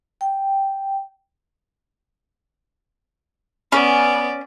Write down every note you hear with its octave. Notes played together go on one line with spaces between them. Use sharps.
G5
B3 C#4 D5